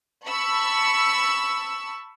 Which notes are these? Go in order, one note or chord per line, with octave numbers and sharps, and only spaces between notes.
A5 B5 C#6 E6